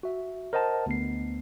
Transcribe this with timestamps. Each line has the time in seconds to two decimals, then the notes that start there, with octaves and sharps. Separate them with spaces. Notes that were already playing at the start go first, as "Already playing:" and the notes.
0.03 F#4 E5
0.53 A#4 C5 D#5 F#5 A5
0.86 D2 B3 C7